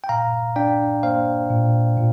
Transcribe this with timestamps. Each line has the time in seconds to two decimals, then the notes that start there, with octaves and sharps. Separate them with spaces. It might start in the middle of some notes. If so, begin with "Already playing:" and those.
0.04 G5
0.09 A#2 F5 A#5
0.56 D4 D5 G5
1.03 A#3 C5 F5
1.50 A#2
1.97 A#2